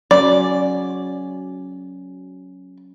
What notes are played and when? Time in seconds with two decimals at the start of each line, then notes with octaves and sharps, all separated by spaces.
0.11 F#3 C#4 D5